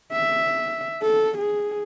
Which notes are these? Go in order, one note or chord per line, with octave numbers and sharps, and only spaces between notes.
E5
A4
G#4